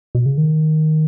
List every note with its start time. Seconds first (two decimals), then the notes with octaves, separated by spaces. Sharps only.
0.15 B2
0.26 C#3
0.38 D#3